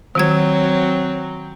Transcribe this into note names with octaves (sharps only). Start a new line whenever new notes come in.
D#3 F#3 C4 G#6